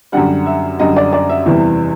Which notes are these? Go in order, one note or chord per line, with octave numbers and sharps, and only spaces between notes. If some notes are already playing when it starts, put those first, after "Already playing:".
F#2 D3 G3 F#5
E5
F#2 D3 G3 D#5
D5
D5
E5
E2 C3 E3 G3